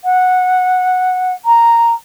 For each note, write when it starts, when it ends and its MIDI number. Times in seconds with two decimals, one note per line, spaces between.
0.04 1.33 78
1.45 1.93 82